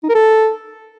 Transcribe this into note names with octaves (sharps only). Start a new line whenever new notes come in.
D#4
A#4
A4